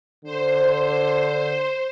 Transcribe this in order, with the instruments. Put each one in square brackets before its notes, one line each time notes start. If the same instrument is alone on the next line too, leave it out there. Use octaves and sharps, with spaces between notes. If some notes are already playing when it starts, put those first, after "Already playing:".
[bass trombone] D3 [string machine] C5